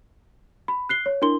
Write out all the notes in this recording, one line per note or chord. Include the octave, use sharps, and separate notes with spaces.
B5
F#6 C7 G7
C#5
D4 E4 A#4 C6 G7